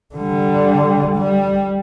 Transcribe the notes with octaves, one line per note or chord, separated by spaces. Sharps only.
D3 G3
G3